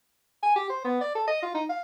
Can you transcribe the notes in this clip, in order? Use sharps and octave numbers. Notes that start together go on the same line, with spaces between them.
G#5
G4
C5
B3
D5
A4
D#5
F4
D#4
F5